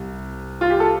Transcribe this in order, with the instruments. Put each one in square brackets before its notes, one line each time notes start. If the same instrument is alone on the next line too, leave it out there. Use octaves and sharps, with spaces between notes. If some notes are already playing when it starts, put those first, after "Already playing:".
Already playing: [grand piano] C2
[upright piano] F4
G4
A4